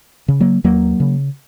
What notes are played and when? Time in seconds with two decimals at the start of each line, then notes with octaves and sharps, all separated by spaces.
0.28 C#3
0.40 F#3 A#3
0.64 D#2 F#3 A#3
1.00 C#3